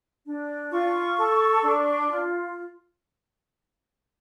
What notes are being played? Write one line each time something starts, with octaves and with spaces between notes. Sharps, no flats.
D4
F4 C#6
A4
D4
F4